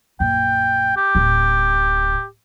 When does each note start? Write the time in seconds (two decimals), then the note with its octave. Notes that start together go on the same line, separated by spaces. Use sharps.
0.20 A#1 F#2 G5
0.97 G4
1.15 D1 A1